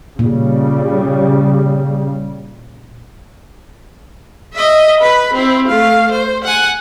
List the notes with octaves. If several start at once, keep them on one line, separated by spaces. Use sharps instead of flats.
A#2 C#3 G3
D#5 E5
B4 B5
C4 E4
A3 F5
C5
F#5 G#5